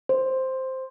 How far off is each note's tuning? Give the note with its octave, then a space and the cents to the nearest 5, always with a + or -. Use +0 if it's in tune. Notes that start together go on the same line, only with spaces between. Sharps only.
C5 +0